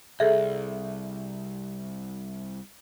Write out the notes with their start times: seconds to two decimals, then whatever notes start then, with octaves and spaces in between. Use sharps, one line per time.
0.20 C2 G#4 A4 E5